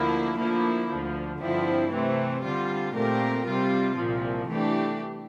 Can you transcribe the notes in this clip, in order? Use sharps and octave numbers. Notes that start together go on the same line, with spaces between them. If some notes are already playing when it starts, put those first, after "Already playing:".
Already playing: D2 D3 F3 A#3 E4
D3 F3 A#3 E4
D2 D3 F3
G2 D3 F3 C4 E4
C3 E3 A3 C4
D3 G3 C4 F4
A#2 A3 C4 G4 A#4
C3 G3 C4 F4
C2 A#2 F3
E3 A3 D4 G4